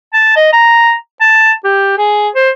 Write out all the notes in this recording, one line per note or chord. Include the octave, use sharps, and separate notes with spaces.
A5
D#5
A#5
A5
G4
G#4
C5